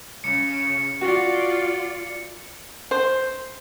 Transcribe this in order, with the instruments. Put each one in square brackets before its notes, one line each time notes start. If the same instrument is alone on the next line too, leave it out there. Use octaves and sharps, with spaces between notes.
[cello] C#3 [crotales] C#7
[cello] F4 D5 [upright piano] F#4
[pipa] C5